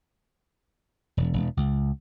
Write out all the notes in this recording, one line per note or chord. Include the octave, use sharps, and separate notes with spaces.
E1
E1
C#2